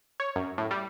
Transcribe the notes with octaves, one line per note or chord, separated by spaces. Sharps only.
C#5
F#2
A2
G3